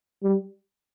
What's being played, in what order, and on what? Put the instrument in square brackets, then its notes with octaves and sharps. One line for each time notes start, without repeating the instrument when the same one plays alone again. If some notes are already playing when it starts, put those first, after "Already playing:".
[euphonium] G3